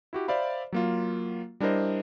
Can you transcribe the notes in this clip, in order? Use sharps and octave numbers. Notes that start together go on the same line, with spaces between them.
E4 F#4 G4
C5 D5 E5 F5 B5
F#3 A#3 F4
G3 D4 E4 A#4 C5 D#5